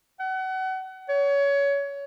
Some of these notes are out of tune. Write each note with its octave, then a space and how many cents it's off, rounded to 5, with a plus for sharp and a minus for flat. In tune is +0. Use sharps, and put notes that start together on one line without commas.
F#5 +30
C#5 +25